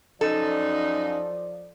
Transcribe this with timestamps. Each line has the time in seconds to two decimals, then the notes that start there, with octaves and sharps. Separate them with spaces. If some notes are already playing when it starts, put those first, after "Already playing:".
0.21 F#2 F3 D#4 A4 D5